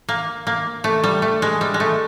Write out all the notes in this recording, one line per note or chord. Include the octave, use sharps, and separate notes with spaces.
A#3
A#3
A3
G3
A3
G#3
G3
G#3
A3